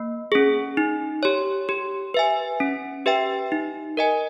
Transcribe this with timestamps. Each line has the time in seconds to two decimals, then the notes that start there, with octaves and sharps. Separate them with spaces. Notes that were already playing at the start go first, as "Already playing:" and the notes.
Already playing: A#3
0.32 C#4 G#4
0.77 D#4
1.23 G4 C#5
1.69 G4
2.14 B4 E5 G#5
2.60 C#4
3.06 G4 B4 E5 G5
3.52 D#4
3.97 A#4 D#5 G#5